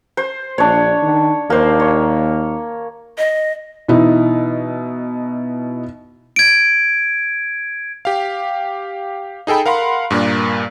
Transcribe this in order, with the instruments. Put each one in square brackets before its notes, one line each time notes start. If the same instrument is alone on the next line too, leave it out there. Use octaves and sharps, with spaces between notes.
[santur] C5
[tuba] A#1 [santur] D4 C#5
[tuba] D#3
[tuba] D#2 [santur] A#3 C5
[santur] C#5
[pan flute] D#5
[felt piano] B2 E3 D#4 E4
[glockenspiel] G#6 D7
[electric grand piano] G4 F5
D#4 G#4 A4 G5 B5
A#4 F5 F#5 B5 C6
G2 A#2 A#3 D4